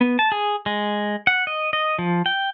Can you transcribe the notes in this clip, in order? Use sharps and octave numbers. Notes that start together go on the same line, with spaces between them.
B3
A5
G#4
G#3
F#5
D#5
D#5
F3
G5